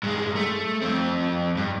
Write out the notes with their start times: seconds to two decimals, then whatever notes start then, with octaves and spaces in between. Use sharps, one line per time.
0.03 G2 G#3
0.35 A3
0.81 F2 C4
1.57 G2